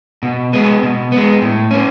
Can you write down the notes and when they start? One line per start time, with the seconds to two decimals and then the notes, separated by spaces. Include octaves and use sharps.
0.23 B2
0.53 G#3 B3
0.83 B2
1.12 G#3 B3
1.42 A2
1.71 A#3 C#4